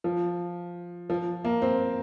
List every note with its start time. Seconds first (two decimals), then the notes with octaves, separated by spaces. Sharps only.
0.04 F3
1.10 F3
1.45 A#3
1.62 C4